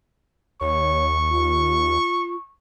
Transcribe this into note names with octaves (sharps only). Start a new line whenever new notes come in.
D#2 C#5 C#6
F4